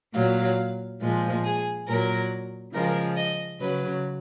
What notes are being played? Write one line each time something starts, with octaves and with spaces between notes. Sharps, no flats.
A#2 F#3 F5
A#2 F3 G#3
G#4
A#2 F#3 A#4
C#3 F3 G#3 A#4
D#5
C#3 F#3 B4